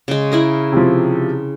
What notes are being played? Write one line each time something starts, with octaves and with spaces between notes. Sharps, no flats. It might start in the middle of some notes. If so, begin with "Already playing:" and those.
C#3 G#3
E4 G#4 A#4
C3 F3